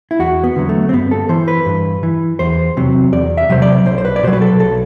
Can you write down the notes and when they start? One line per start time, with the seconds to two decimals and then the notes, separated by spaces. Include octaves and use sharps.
0.11 E4
0.19 E2 F#4
0.44 B3
0.56 D3 F#3
0.69 A3
0.89 C4
0.93 G2 B3
1.11 A4
1.29 E3 C5
1.48 B4
1.66 G2
2.03 E3
2.39 E2 C5
2.77 C3 F#3
3.13 E2 D5
3.37 E5
3.49 C3 F#3 C5
3.62 D5
3.86 B1 C5
3.98 C5
4.05 B4
4.16 D5
4.23 B2 F#3 C5
4.33 B4
4.42 A4
4.60 B1 A4